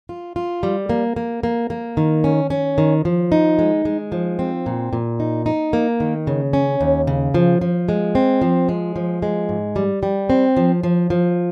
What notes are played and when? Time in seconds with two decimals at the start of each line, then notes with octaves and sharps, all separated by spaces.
0.09 F4
0.36 F4
0.63 G3
0.89 A#3
1.16 A#3
1.43 A#3
1.70 A#3
1.97 D#3
2.24 C#4
2.50 C#4
2.78 D#3
3.05 F3
3.32 D#4
3.59 G#3
3.85 G#3
4.12 F3
4.39 C4
4.66 A#2
4.93 A#2
5.20 D#4
5.46 D#4
5.73 A#3
6.00 D#3
6.27 C#3
6.53 C#4
6.81 D#2
7.07 C#3
7.34 F3
7.61 F3
7.89 G#3
8.15 C4
8.42 F3
8.69 G#3
8.96 F3
9.23 G#3
9.49 G#2
9.76 G3
10.03 G3
10.30 C4
10.57 F3
10.83 F3
11.10 F3